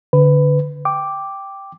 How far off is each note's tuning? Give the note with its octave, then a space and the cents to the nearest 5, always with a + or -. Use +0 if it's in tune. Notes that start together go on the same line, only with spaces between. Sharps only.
D3 -15 B4 +15
G5 +0 D6 +0